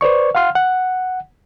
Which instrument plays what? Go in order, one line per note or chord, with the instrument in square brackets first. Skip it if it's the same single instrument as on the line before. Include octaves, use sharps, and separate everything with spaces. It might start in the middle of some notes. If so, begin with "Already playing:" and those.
[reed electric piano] B4 C5 D5 C#6
F5 F#5 C6 F6
F#5